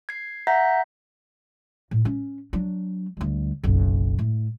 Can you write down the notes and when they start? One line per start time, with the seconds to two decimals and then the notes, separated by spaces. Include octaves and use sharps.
0.09 G#6 C7
0.47 E5 F#5 A#5 G6 A#6 B6
1.91 A2
2.05 C#4
2.53 F#3 D4
3.17 D2 G3
3.64 F#1 B1
4.19 A2